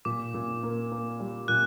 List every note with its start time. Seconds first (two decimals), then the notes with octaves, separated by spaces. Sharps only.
0.05 A#2 D6
0.34 A#2
0.63 A#3
0.92 A#3
1.20 G3
1.48 A#2 F#6